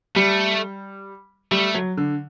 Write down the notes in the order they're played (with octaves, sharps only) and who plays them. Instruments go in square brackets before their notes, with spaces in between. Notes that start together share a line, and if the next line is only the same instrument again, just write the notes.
[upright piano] G3 [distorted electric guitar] A3
[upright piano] G3 [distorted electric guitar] A3
[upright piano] F#3
D3